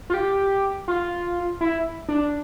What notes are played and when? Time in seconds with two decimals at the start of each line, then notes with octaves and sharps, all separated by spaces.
0.10 F4
0.14 G4
0.88 F4
1.61 E4
2.09 D4